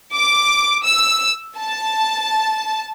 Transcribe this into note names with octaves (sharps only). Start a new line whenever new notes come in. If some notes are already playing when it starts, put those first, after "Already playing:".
D6
E6
A5